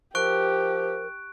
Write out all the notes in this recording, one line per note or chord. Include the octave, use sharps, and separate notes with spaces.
F3 G4 A#4 C#6 F#6 D7